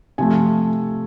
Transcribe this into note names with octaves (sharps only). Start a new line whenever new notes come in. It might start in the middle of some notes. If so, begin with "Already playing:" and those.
C3 F3 A3 G#5